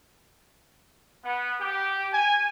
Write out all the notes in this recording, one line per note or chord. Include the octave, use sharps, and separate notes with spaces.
B3
G4
G#5